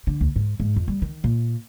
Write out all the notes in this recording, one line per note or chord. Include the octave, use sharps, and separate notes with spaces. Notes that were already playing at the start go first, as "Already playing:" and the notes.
D3
D2
G#2
G#2
F2
G3
D#3
A#2